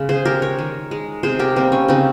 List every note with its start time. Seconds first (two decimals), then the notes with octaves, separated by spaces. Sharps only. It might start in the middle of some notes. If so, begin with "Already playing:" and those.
Already playing: C#3 G#3
0.09 G#4 C5
0.25 G#3 G4 A#4
0.42 A#4 C#5
0.59 D#3
0.91 G#3
1.23 C3 G#4 C5
1.39 G4 A#4
1.56 G3 A#3 C4
1.72 C#4
1.88 C#3 C4 D#4